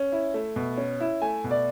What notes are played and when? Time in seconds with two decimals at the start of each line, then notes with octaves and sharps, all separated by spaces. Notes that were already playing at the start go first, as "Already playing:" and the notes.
Already playing: C#4
0.12 E4
0.34 A3
0.56 B2
0.77 C#4
1.00 E4
1.22 A3 G#5
1.44 B2
1.51 D5